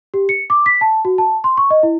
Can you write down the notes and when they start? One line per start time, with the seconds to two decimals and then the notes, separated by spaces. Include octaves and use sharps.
0.14 G4
0.29 C#7
0.50 D6
0.66 B6
0.81 A5
1.05 F#4
1.18 A5
1.44 C6
1.58 C#6
1.70 D#5
1.83 E4